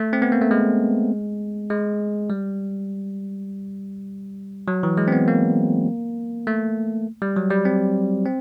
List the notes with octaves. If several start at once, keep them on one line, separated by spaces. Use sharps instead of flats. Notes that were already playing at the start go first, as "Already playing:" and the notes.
Already playing: A3
C4
B3
A#3
A3
G#3
G#3
G3
F#3
E3
G#3
C4
B3
A#3
A3
G3
F#3
G3
C4
C4